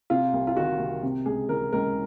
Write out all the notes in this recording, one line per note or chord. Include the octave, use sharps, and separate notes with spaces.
C3 F4
C2
F4
D#3 F#4
C2
C3
C#2 G#4
E3 A#4
C#2 A#4